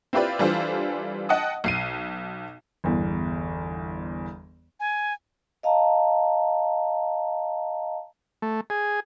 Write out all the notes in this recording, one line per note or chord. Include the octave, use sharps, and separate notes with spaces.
C4 E4 F4 G4 B4 D5
E3 G3 D4 F4 A4 C5
D#5 F#5 G5 A5 D#6
B1 C7 D#7
G1 E2
G#5
D#5 F5 A5 A#5
A3
G#4